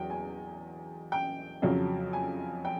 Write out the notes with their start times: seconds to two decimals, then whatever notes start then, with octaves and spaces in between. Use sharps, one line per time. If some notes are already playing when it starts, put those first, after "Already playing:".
Already playing: E2 F#3 G5
0.10 G#5
1.12 G5
1.62 F2 C#3 F#3
2.13 G#5
2.65 G5